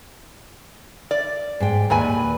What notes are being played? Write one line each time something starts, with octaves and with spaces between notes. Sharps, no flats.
D5
G#2 G5
D#2 A#2 B4 G#5